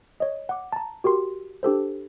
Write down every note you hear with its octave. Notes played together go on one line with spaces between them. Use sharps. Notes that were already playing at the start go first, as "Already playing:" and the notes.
C#5 D#5
F#5 D6
A5 A#5
F#4 G4 A#4 C6
D4 G4 A4 C5